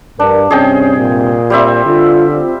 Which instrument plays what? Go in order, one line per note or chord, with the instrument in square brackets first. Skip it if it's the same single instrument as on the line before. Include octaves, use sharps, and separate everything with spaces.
[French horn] G2 [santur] D4 [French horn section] A#4
[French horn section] G2 C3 C4 [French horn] C#4 [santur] G#4 D#5 G5
[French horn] A#2
[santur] G3 C4 E5
[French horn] D3 [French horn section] F4
[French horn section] C4 F4